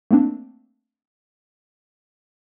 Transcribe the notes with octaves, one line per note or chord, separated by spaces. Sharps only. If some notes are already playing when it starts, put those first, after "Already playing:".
A3 A#3 C4 D4